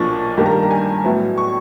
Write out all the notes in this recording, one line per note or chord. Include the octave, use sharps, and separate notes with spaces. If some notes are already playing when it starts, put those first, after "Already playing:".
Already playing: B1 A#2 F3 A#3 D4 C#6
G2 D#3 G3 A#3
A#5
A#5
G#5
A2 F#3 B3 E4
C#6